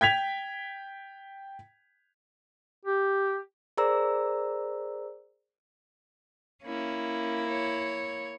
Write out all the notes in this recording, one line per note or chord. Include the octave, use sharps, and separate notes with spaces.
G5 G#6 B6 F7
G4
G#4 A#4 C5 D5 A#5 E6
A#3 C#4 E4
C#5